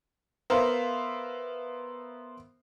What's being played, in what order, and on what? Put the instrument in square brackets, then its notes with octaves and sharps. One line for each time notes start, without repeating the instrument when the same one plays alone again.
[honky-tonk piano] B3 A#4 C5 E5 F5